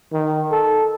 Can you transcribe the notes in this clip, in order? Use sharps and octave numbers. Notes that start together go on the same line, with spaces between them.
D#3
A4